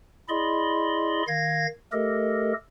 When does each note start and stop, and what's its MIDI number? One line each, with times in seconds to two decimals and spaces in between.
0.29 1.22 64
0.29 1.22 68
0.29 1.22 74
0.29 1.22 75
0.29 1.22 83
0.29 1.22 84
1.28 1.67 51
1.28 1.67 77
1.28 1.67 92
1.28 1.67 94
1.92 2.53 57
1.92 2.53 67
1.92 2.53 69
1.92 2.53 70
1.92 2.53 75